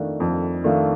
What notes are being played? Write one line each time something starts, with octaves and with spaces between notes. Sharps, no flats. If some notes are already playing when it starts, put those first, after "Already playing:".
Already playing: F2 D#3 A3 D4 F4
F2
D#3 A3 D4 F4